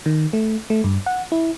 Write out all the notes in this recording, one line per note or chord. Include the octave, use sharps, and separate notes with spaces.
D#3
A3
A3
G2
F#5
E4